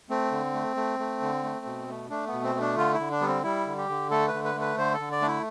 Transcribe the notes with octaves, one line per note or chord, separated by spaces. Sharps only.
A3 C4
D3
A3
A3
A3
D3
A3
B2
A3
A3 D4
B3
B2
C4
A3
D4
D3 F4
E4
D3
D4
G3 B3
C4
G3 E4
D3
G4
D3
A3 A4
B4
D3
B4
A3
B4
D3 C5
A4
D3
D5
A3 D4
E4